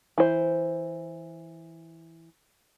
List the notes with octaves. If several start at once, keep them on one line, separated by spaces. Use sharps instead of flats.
E3 C5